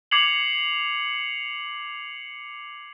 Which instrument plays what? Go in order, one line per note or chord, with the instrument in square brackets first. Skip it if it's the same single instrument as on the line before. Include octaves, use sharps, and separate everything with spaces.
[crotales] D6 G#6 C7 C#7 F7 F#7